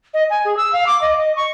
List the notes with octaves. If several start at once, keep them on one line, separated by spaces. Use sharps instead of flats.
D#5
G#5
G#4
E6
F5
D6
D#5
D#5
C#6